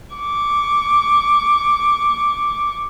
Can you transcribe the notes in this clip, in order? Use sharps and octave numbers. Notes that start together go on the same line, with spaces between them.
C#6 D6